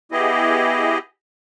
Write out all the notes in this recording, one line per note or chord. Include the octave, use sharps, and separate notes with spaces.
B3 E4 G4 G#4 D#5